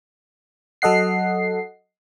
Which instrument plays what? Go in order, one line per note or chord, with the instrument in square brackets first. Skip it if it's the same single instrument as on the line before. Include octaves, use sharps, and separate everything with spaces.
[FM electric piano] F#3 A4 D#5 F#5 C7